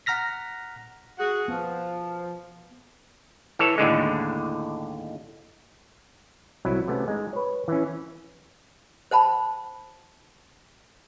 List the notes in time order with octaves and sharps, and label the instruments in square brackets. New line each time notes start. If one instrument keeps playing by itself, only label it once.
[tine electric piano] F#5 A#5 F6 A#6 B6
[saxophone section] F#4 G#4
[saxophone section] F3 [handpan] B3
[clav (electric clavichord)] E3 A4 C#5
D#2 A2 D3 G#3
C2 F#3 E4
C3 A3 B3 C#4
G#3 D#4
B4 C#5
E3 C#4
[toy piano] C5 F#5 A5 B5